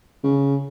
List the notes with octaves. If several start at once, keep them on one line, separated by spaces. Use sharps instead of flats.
C#3